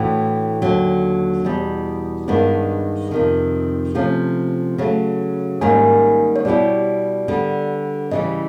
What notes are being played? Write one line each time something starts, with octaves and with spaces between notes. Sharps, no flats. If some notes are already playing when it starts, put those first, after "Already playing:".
Already playing: A2 E3 A3 D4 F#4 G5
D#2 D3 F#3
E2 B2 G3
G2 D#3 G#3 B3 D4
F2 C3 D#3
C3 F3 A3 C#4
C#3 F#3 A3
G#2 D#3 G3 A#3 C#4 G#5
C#5
B2 G3 B3 E4 G4 D5
D3 G3 B3
C#3 E3 G3 D#5